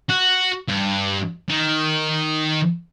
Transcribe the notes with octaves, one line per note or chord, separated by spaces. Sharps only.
F#4
G2
D#3